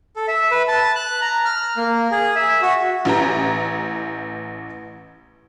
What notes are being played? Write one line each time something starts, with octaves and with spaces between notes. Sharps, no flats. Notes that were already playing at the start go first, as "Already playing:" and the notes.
A4
E5
B4
A5
F#6
A#5
F6
A#3
G#4
E5
F#4
A1 E3 G4 A#5